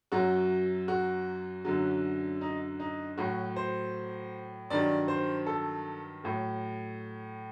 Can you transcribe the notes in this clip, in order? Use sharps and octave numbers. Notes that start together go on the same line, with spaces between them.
F#2 F#3 F#4
F#4
F#2 D3 F#3
D#4
D#4
A2 F#3 F#4
C5
G2 D#3 F#3 D5
C5
A4
A2 F#3